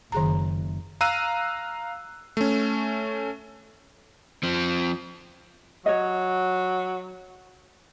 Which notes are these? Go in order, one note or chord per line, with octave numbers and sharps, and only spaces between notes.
F#1 D#3 G#4 A#5
F5 A#5 E6 F#6 D#7
A3 C#4
F3 C4
F#3 C#5 D#5